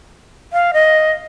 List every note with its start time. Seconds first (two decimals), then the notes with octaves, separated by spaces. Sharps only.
0.53 F5
0.73 D#5